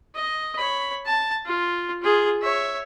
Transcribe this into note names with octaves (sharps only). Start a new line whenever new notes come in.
D#5
C#5 B5
A5
F4
F4 G#4
C#5 E5